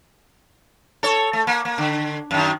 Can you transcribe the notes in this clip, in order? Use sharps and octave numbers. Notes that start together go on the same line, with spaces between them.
A4 C#5
A3
A#3
A#3
D3
F#2 D#3